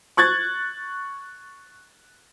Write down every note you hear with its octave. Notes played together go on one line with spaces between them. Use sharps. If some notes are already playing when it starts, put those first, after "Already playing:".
C#6 F#6 G#6 A6